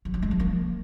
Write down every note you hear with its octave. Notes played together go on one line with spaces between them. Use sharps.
F3
F#3
G#3
F3
A#3